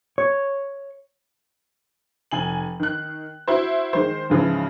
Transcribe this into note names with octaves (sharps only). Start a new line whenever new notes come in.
C#5
F1 G#5 F#7
D#3 F#6
E4 F#4 C5
D#3 G#3 C5
G#2 C#3 E3 F3